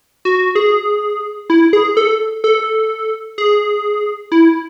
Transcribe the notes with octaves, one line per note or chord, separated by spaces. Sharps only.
F#4
G#4
E4
G#4
A4
A4
G#4
E4